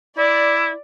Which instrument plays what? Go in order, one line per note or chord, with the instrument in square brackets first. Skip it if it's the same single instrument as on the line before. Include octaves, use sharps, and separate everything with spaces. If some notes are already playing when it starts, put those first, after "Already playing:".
[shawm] E4 [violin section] D5